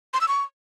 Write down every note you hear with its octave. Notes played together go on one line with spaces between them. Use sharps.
C6
E6
C#6